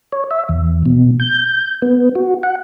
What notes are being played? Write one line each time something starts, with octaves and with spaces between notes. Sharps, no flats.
C#5
E5
E2
B2
G6
B3
F#4
F#5